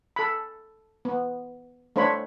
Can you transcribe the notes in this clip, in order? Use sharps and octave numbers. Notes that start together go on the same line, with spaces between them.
A4 B5
B3
A3 D4 C5 C#5 B5